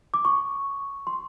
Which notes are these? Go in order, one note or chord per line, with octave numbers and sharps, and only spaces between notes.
D6
C#6
C6